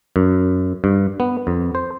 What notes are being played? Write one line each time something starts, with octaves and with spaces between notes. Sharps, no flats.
F#2
G2
B3
F2
C5